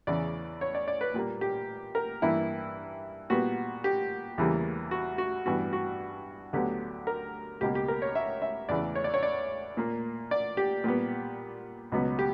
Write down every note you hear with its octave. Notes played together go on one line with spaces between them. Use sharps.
E2 C#3 E3 D5
C#5
D5
D5
B4
A#2 G3 A#3
G4
A#4
G2 E3 A#3 E4
A#2 G3 B3 F#4
G4
E2 C#3 E3 G3 A#3
F#4
F#4
G2 E3 B3 F#4
F#4
D2 D3 F#3 B3 G4
A#4
C#2 B2 A#3 G4
G4
A#4
C#5
E5
E5
E2 C#3 E3 D5
C#5
D5
C#5
D5
A#2 A#3
D5
G4
A#2 G3 B3
C#2 B2 F#3 B3
G4